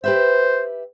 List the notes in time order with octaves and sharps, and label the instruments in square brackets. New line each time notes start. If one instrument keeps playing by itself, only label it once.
[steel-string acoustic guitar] G4 B4 E5 [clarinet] C5